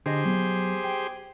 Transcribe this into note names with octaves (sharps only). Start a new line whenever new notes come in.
D3 G4 G#4 C5 D#5
F#3 B3
G5